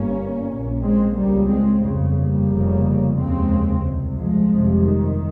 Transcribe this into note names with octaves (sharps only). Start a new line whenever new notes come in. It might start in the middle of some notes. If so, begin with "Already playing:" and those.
Already playing: G1 G2 A#3 C#4
A#1 A#2
G#3 C4
C#2 C#3 G3 A#3
G#3 C4
G1 F2 C#3
G3 A#3
F1 F2 C#3
F1 D#2 C#3 G#3 C4
C2 C3
F3 G#3
G1 F2 C3
D#3